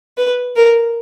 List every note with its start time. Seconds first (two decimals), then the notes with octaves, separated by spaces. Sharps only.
0.18 B4
0.56 A#4